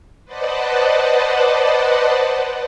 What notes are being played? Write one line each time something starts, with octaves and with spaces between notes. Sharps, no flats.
B4 C5 D5 D#5 F#5 A5